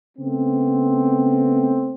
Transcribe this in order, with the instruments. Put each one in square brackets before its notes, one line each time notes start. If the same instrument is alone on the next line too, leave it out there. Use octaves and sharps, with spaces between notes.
[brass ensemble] C#3 A3 B3 C4